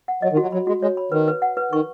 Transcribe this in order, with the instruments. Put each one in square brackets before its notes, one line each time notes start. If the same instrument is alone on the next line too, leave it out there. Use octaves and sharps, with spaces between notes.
[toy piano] F#5
[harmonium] F#3 [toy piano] D#5
[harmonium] D#3
[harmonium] F#3 [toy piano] F#4
[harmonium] F#3 [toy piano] B5
[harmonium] G#3 [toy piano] F#4
[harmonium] G#3 [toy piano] C#5
[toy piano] B5
[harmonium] D#3 [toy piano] B4
[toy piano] B4
F#5
B4
[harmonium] D#3 [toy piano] C#6